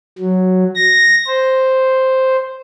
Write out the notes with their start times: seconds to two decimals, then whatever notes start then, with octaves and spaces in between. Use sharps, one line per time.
0.18 F#3
0.75 A#6
1.27 C5